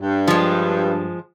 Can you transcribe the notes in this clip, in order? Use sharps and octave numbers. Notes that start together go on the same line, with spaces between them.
G2
F3 G#3